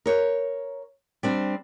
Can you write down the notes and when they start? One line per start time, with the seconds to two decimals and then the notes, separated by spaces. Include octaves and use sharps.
0.06 A#4 C#5
1.23 G3 C4 D4